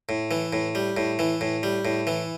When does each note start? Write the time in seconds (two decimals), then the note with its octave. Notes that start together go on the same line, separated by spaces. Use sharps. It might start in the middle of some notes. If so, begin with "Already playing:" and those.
0.09 A2
0.31 E3
0.53 A2
0.75 G3
0.97 A2
1.19 E3
1.41 A2
1.63 G3
1.85 A2
2.07 E3